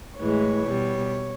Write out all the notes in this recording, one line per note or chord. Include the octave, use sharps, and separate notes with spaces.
A2 E3 G#3 C#5
B2 G3